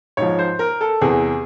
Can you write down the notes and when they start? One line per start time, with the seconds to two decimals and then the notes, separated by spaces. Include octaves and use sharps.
0.17 G#2 F3 C#5
0.39 C5
0.59 A#4
0.81 A4
1.01 E2 C3 E3 G#4